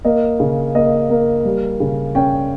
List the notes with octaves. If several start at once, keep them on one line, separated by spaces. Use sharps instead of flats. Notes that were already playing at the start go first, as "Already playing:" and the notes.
A#3 D#5
C#3
A#3 D#5
A#3
G3
C#3
C#4 G5